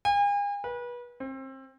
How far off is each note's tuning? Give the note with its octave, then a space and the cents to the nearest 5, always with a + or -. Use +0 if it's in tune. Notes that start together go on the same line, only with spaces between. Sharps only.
G#5 -40
B4 -30
C4 +30